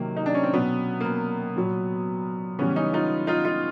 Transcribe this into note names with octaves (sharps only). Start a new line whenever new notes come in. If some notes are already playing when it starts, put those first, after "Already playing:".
Already playing: C3 D#3 F#3 A#3
D#4
D4
C#4
C4
B2 F#3 B3
A#3
B3
A#2 F#3
C#3 E3 G3 B3 C#4
C#4 D#4
D#4 F4
D#4 F4
D#4 F4